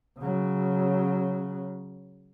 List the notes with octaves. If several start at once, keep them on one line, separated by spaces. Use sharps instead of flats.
C#3 F#3